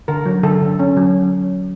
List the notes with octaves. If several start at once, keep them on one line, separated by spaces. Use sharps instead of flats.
D3 A#4
F#3
D3 A4
D3
C#4
F#3